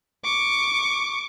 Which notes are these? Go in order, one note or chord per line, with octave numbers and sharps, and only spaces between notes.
C#6 D6